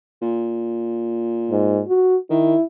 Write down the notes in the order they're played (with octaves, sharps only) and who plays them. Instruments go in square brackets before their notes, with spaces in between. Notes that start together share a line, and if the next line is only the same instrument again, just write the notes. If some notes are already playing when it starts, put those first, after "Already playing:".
[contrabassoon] A#2
[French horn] G#2
F#4
[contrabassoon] D#3 [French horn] E4